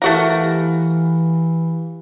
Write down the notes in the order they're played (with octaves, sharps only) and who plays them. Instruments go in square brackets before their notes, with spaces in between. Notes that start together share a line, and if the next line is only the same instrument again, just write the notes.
[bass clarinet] E3 [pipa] A3 F#4 A#4 [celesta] E4 G4 F5